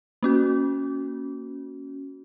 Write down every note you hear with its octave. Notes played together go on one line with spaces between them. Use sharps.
A#3 C#4 F#4